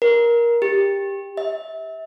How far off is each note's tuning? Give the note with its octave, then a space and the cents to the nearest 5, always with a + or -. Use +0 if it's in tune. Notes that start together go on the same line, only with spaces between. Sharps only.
A#4 +15
G4 +15
E5 -30